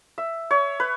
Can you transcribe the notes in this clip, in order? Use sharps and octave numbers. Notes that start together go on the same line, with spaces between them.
E5
C#5
B4